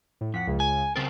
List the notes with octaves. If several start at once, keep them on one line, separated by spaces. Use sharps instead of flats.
A2
F2 F#5 B6
C#2 C#3
G#5
C#3 C4 A#4 A6